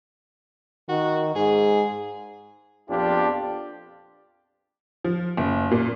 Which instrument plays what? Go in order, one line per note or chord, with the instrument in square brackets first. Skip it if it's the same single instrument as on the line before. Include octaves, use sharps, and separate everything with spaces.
[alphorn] D#3 [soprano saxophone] F#4
[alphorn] G#2 [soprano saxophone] G#4
[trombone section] A#1 F2 B3 D4 F4 G4
[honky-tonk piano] F3
F#1
A#2